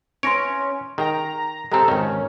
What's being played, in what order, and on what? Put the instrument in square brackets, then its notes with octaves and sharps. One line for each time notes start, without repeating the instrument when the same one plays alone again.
[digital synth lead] C#4 [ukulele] E4 B4 [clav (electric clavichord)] C#5 [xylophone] C6 A#6 D7
[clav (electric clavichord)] D#3 [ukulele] G#4 G5 [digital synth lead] A#5
[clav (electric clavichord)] G#3 C4 [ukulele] G4 A#5 [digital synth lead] A4
[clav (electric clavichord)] G#1 D#3 [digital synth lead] C#4 [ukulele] D#4